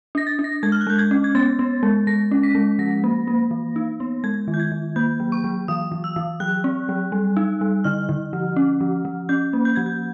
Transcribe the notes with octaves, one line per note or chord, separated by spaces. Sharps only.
D4 A#6
A6
D4
A#6
G#3 G#6
F6
F#6
G#3 G6
G#6
C#4
G#6
B3 A6
B3
G#3
G#3 A#6
C#4
B6
G#3
F3 A#6
A#3
A#3
E3
D#4
B3
G#3 G#6
D#3
G6
G#6
D#3
A#3 G6
F#3
C#6
F#3
E3 D#6
E3
E6
E3
F#3 F#6
C4
F#3
G3
D#4
G3
D3 F6
D3
F3
C#4
F3
F3
C#4 G6
A#3
G6
F3 G#6
G6